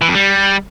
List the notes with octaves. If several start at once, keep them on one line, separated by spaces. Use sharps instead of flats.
E3
F2
G3